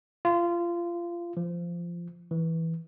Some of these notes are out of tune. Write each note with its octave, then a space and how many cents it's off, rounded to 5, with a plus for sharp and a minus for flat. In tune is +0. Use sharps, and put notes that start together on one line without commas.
F4 -20
F3 -15
E3 -10